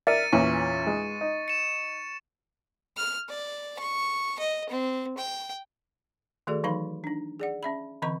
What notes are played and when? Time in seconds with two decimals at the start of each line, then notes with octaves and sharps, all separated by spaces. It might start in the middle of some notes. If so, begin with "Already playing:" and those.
0.07 A#4 D5 E5 A6 C#7 D#7
0.32 E2 A#2 C#4 C#6
0.87 G#3 D#4
1.21 D#4
1.48 C#7 E7
2.97 F6
3.29 D5
3.79 C#6
4.39 D#5
4.69 C4
5.17 G5
6.47 D#3 A3 F#4 G#4 A4 D5
6.64 E3 F#3 D#4 F5 B5 C6
7.04 D4 D#4
7.40 G#4 D5 F#5
7.63 C#4 E5 B5
8.02 D3 E3 C4 D#5 A#5 C#6